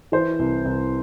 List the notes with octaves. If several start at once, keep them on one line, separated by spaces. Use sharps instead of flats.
E3 C5
C2
C2